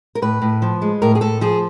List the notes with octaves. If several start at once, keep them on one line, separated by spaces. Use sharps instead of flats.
A#4
A2 B4
A2
F3
G#3
A2 A#4
G#4
A2 A4
F3 G#4